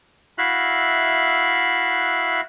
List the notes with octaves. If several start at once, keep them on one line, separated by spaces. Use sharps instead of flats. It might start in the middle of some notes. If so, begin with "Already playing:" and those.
E4 F#4 E5 F5 F#6